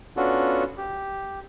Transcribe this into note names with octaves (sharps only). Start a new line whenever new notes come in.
B3 C#4 D4 F4 F#4 A4
G4